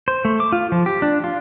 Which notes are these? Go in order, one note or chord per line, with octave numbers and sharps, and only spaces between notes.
C5
A3
D6
F4
F3
G4
D4
F4